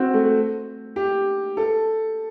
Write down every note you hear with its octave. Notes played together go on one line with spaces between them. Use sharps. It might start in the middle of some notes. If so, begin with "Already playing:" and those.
Already playing: C4 F#4
A3
G4
A4